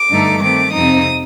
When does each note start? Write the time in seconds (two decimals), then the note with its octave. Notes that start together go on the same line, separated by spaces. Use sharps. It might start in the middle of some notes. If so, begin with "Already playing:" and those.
Already playing: D6
0.10 G2 D3 A3 D#4
0.40 D#3 A3 C4 D6
0.72 F2 C3 F3 C4 D#4 D#6